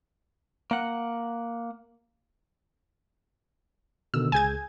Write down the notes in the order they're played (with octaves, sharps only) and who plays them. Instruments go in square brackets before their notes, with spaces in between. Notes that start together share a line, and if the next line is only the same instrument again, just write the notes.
[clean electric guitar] A#3 F#5
[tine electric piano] B2 D3 D#3 [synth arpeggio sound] E6
[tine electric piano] C#2 G#4 [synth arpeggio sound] G#5 G6 G#6